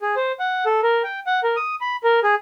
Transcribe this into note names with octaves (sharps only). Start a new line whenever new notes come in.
G#4
C5
F#5
A4
A#4
G5
F#5
A#4
D#6
B5
A#4
G#4